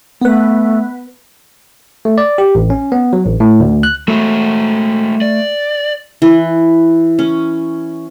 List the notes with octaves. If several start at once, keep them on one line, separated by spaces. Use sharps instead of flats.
A3 B3 B4
A3
D5
G4
A1
C#4
B3
F#3
A1
A2
D2
F#6
G#3 A3 F#4
D5
E3
C#4